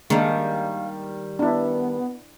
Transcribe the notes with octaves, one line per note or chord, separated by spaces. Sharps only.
D#3 G3 G#3 A#3 D4 F5
B3 D4 E4